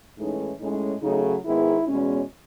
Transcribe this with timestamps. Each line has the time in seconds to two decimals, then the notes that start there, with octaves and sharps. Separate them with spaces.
0.17 A2 E3 G#3 C#4 D#4
0.59 A2 G#3 C#4 D#4
1.01 C#3 F#3 A3 D#4
1.44 G#2 D#3 G#3 B3 E4
1.86 E2 B2 G#3 C#4